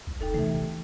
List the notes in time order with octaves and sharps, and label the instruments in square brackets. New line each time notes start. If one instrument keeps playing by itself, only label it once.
[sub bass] C2
[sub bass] D#1 [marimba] D#2 D#4 A4
[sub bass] C3 [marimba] E3 A3